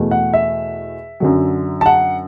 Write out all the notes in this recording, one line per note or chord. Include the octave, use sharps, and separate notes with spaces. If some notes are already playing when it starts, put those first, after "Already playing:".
Already playing: E2 B2 A3
F#5
E5
F#2 D3 F#3
A5
F#5